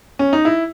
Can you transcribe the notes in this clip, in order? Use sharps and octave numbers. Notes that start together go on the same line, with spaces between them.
C#4
D#4
E4